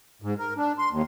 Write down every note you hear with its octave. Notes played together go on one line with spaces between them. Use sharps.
G#2
A#4
D4
C6
D#2